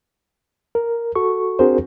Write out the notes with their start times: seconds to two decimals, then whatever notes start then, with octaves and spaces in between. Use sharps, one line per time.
0.75 A#4
1.16 F#4 A4 C#6
1.59 C4 D4 F#4 G#4 A#4 C5